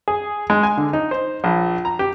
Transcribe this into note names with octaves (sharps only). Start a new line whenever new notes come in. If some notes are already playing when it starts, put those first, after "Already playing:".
G#4
G#3
G#5
D3
D#4
C5
A#1
A#5
G4